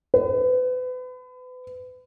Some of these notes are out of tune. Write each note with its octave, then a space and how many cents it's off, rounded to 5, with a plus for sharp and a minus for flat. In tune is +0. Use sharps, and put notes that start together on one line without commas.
B4 +35